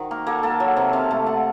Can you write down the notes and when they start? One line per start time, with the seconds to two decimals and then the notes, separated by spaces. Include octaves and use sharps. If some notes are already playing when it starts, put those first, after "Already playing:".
Already playing: D#3 F#4 C5
0.11 A#3 A#4
0.27 A#3 A4
0.43 A#3 A4
0.60 F#3
0.77 C3
0.93 C3 F5
1.11 A3
1.27 A3 F#5